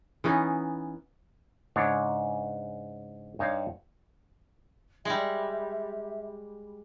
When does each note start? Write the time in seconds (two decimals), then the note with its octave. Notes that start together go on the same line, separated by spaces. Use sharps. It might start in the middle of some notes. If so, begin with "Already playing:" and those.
0.24 E3 B3 C#4 D#4
1.76 G#2 C#3 D4 C#5
3.39 G2 D#4 C#5 D5 F5 A5
5.05 G3 G#3 E5